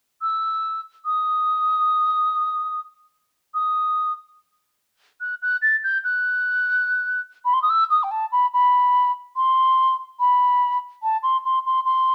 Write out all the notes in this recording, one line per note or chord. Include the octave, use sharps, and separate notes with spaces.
E6
D#6
D#6
F#6
F#6
A6
G6
F#6
B5
C6
D#6
E6
D#6
G5
A5
B5
B5
C6
B5
A5
C6
C6
C6
C6